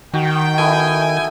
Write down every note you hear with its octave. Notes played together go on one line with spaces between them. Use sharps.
D#3 F#4 G5
A3 B3 E4 G#5